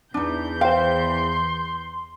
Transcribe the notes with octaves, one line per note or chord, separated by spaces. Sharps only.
E2 E3 D4 D#4 G6
C5 F5 G5 C6